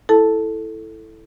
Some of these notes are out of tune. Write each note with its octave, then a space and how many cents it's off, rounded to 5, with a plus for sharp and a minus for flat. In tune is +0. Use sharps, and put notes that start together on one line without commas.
E4 +0 A4 +0 A5 +0